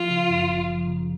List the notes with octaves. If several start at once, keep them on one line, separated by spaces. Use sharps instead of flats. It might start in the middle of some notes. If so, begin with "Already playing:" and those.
Already playing: F3 F4
C#3
F#2
G1
F3
C#3